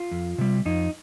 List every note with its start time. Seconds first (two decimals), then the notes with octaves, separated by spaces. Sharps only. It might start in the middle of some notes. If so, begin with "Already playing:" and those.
Already playing: F4
0.11 F2
0.38 C3 G3
0.65 F2 D#4